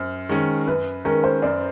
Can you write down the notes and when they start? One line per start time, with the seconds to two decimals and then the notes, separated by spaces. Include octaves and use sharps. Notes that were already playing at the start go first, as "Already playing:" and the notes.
Already playing: F#2 C5
0.29 D#3 G#3 C#4
0.67 F#2 B4
1.05 D#3 G#3 C#4 A#4
1.24 C5
1.42 F#2 D5